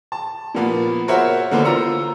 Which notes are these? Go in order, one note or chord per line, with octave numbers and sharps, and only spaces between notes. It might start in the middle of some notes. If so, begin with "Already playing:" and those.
A5
A#2 F3 A#3 B3
F#4 A#4 C5 C#5 E5 F#5
D3 E3 A#3 B3 C5
F4 A#5 E6 C#7